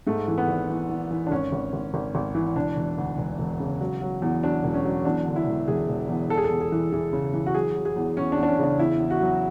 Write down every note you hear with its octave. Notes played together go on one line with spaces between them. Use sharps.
G#2 A3
E3
B3
G#1
E3
E3
E3
D4
G#1 C#4
G#1
G#1
G#1
G#1
E3
E1 D4
E1
D2
E1
E1
C#3
F#3
F#3
E2
F#3 D4
E1
C#4
F#3
E2 D4
D3
E4
E1
E1 G#4
E1
E2
E3 A4
G#4
A4
E2
G#4
E3
E3 G#4
C#3
E3
F#4
F#3 G#4
F#3
G#4
E2
E2 C#4
D4
E2
D4
C#4
C#3 D4
E2 E4
E2
F#4
F#3